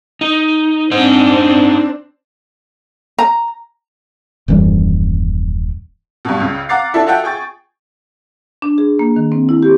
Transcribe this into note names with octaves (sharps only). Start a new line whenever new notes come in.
D#4
C4 D4 D#4 C5
A#5
D#1 F#2 E3 G3
G2 B2
C#2 C#3
F5 F#5 A#5 D6 A6 C7
D4 E4 F#4 A4
F4 F#4 A4 E5 F#5 G5
G#4 G5 C#6 A6
D4
G#4
A#3
D#3
C4
E4
G4